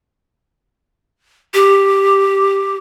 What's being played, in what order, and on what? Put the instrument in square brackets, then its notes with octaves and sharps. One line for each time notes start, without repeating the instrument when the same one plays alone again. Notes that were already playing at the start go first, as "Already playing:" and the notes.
[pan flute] G4